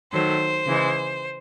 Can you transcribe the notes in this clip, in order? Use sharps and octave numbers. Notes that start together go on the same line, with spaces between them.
D#3 F#3 A3 C5
C#3 E3 G#3